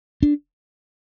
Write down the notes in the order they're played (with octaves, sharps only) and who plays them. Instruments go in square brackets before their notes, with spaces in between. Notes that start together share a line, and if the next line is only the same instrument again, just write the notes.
[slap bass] D4